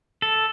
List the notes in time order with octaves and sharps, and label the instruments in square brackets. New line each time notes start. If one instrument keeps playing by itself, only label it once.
[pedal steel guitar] A4